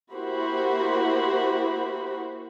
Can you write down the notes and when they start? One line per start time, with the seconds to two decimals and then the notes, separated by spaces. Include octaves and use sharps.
0.13 A#3 E4 F#4 G4 C5 B5